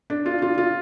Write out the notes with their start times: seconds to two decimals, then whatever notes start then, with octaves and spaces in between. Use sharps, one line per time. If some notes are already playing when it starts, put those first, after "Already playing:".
0.10 D4
0.26 F4
0.42 F4
0.58 F4